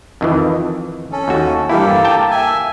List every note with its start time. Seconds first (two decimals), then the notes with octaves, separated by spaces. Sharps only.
0.21 F2 D#3 E3
1.12 C#4 A4
1.28 D#2 F#4
1.69 G2 E3 A#3 E4 G4 A4
2.05 G5 A5
2.31 E5 G#5